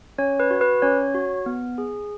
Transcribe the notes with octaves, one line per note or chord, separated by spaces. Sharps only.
C#4 C#5
B4
F#4
B4
C#4 C#5
F#4
B3
G#4